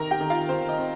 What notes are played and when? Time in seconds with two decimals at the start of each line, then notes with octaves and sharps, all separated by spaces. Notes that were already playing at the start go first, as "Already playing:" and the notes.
Already playing: C3 D#3 A#4 A#5
0.11 G4 G5
0.21 D#3
0.30 F4 F5
0.49 D#3 C5
0.69 D#5
0.78 C4